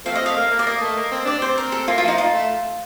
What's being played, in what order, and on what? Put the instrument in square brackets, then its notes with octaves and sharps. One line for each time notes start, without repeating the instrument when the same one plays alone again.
[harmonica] F3 A3 C4 [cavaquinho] F5
[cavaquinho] D#5
[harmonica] A3 [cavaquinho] F5
[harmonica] A#3
A#3
[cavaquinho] D5
[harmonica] A#3 [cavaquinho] D#5
[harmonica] A3
A#3
C4
[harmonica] D4 [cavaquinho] D5
[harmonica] C4 [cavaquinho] C5
[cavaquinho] A#4
A4
[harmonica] A#3 [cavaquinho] F4
[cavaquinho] F4
[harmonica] F3
[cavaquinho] D#4
F4
[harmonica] A3